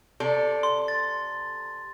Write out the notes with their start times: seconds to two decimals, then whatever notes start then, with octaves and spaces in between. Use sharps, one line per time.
0.20 C3 A4 D5
0.63 C6
0.88 A6